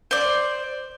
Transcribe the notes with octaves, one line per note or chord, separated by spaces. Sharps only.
C5 D5